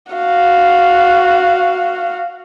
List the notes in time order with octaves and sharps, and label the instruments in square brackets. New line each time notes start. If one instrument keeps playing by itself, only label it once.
[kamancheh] F#4 F5